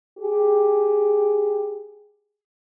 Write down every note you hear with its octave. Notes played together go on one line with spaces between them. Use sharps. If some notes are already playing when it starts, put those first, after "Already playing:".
G4 G#4